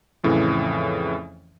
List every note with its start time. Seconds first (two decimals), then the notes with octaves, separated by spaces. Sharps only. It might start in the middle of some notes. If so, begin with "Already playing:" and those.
0.24 F2 A2 C#3 E3